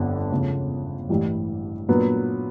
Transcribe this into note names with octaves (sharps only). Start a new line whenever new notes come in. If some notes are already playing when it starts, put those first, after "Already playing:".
Already playing: G1 F2 D3 G3 B3
E2 C#3 F3 A3
A1 G2 E3 G3
A#2 F#3 B3 D4